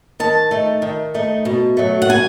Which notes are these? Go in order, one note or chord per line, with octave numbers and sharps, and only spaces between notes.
D#3 A5
A3 D#4
D#3
A3 D#4
B2
F#3 A3
F#5
B2 G#5